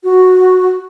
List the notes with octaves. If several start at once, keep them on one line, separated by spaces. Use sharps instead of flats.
F#4